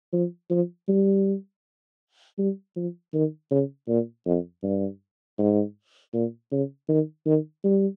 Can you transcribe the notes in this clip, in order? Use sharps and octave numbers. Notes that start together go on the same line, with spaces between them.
F3
F3
G3
G3
F3
D#3
C#3
A#2
F2
G2
G#2
A#2
C#3
D#3
D#3
G3